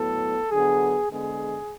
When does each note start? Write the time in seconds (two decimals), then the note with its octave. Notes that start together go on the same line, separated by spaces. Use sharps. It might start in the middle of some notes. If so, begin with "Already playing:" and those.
Already playing: A2 F#3 B3 A4
0.50 D3 F#3 B3 G#4
1.10 D3 G#3 B3 G#4